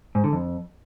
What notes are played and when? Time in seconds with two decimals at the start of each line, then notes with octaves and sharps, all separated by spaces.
0.15 G#2
0.24 D3
0.33 F2